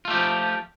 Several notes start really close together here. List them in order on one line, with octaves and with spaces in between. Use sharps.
F4 A3 G4 F3